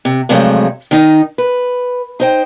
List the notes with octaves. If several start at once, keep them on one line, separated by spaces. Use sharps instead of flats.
C3
G2 C3 F3 F#3 G#3 A3
D#3 D#4
B4
D#4 C5 G5